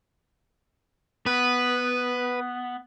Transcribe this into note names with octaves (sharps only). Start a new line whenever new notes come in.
B3 B4